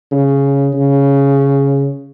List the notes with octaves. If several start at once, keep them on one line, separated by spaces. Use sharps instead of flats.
C#3
C#3